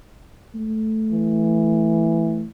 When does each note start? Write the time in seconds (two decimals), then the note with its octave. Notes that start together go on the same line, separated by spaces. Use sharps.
0.55 A3
1.12 E3